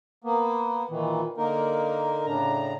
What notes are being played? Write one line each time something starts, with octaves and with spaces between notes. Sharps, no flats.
A#3 B3
A#2 D#3 E3
D3 A#3 D#4 A#4
A2 C#3 D4 A#5